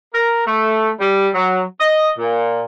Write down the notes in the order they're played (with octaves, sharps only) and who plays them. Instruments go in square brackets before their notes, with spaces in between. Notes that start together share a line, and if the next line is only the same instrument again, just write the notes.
[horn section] A#4
A3
G3
F#3
D#5
A#2